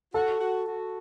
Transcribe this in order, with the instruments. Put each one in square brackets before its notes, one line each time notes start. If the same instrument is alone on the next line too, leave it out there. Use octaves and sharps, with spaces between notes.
[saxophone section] F#4 [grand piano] A4
[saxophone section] F#4
F#4